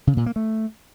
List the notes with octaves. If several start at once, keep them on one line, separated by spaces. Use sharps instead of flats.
C#3
A#2
A#3
A3